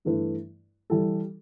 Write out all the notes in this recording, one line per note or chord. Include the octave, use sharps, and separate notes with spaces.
G2 E3 A3 E4 B4
E3 G3 E4 A4